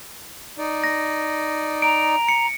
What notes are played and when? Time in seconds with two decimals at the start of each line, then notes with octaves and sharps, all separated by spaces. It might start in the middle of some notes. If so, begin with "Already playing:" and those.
0.58 D#4 D5
0.84 A#6
1.82 A#5 D7
2.28 C#7